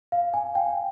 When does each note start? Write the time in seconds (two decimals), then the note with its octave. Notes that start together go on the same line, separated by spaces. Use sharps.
0.12 F5
0.34 G#5
0.55 G5